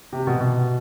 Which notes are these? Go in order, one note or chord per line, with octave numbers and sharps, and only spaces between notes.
C3
B2
B2